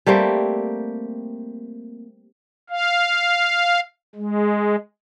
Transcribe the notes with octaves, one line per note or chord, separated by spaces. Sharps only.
G3 A3 A#3 C4
F5
G#3